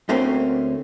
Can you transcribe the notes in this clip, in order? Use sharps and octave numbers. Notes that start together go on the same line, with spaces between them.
D2 D3 A3 A#3 C4 C#4